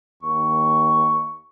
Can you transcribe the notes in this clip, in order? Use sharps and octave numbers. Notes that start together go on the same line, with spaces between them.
D#2 C#6